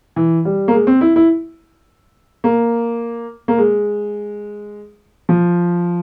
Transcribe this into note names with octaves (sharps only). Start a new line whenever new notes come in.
E3
G3
A#3
G#3
C4
E4
E4
A#3
A#3
G#3
F3